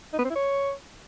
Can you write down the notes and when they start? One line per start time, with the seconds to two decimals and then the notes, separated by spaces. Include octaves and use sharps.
0.13 D#4
0.19 B3
0.25 C4
0.30 E4
0.36 C#5